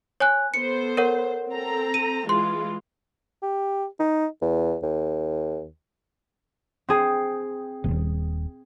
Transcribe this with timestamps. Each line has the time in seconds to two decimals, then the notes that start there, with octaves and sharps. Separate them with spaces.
0.20 C#5 G#5 F#6
0.54 B3 A4 C5 C#7
0.97 A#4 C#5 F#5
1.50 C4 A4 A#5
1.94 D#7
2.29 E3 G#3 F4 C6
3.42 G4
3.99 D#4
4.42 E2
4.83 D#2
6.88 C4 G#4
7.84 D#1